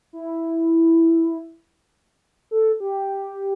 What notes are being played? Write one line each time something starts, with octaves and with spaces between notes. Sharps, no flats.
E4
A4
G4